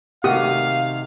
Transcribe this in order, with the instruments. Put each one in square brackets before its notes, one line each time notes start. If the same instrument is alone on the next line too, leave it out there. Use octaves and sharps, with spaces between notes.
[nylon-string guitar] C3 D#3 A3 [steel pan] F#4 G4 D#6 [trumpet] F5